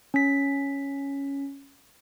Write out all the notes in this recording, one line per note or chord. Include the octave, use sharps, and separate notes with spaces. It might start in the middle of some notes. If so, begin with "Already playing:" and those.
C#4 B6